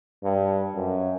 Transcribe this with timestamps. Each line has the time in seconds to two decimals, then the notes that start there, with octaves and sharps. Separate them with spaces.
0.24 G2
0.76 F#2